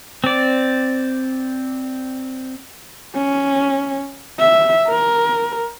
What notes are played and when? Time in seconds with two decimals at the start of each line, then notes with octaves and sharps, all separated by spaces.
0.24 C4 D5
3.15 C#4
4.40 E5
4.88 A#4